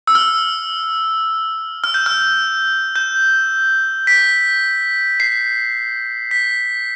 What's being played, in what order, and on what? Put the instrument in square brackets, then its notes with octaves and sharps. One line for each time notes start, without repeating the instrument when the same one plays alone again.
[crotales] E6
F6
F6
G6
F6
G6
B6
C7
B6